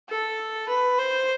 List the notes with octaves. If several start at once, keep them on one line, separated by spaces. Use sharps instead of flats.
A4
B4
C5